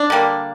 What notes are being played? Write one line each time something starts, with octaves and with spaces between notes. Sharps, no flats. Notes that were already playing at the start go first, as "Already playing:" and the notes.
Already playing: D4
D3 G3 A#3